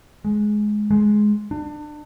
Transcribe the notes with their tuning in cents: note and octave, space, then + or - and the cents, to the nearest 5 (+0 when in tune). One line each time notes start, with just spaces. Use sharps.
G#3 +15
G#3 +10
D4 +30